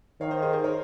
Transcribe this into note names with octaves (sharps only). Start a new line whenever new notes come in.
D#3 C#5 F5
C5 D#5
G#4 C5
G#4 C5
A#4 C#5